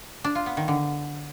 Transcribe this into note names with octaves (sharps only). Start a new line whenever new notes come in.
D4
F4
B3
D#3
D3